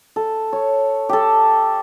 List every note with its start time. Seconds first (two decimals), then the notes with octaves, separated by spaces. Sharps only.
0.16 A4
0.53 C#5
1.09 G4 A4